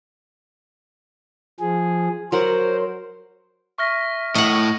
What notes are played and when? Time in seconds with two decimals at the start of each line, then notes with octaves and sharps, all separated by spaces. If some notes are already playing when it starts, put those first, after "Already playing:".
1.60 F3 G#4
2.32 F#3 A#4 C5 F#5
3.78 E5 C#6 F6 A#6
4.35 A2 D#5 F#5 C#6